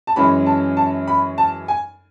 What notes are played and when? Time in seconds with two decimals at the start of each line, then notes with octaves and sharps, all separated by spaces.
0.07 A5
0.16 F#2 E3 G#3 C#4 B5
0.46 A5
0.77 A5
1.08 B5
1.38 A5
1.68 G#5